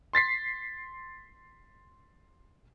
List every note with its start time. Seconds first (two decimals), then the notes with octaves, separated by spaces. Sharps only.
0.13 C6 A6 B6 C7